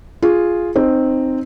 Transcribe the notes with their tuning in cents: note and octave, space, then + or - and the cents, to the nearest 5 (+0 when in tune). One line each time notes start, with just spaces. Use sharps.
F4 +0 G#4 +0
C4 +0 D#4 -15